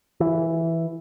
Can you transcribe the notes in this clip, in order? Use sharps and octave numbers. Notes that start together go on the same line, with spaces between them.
E3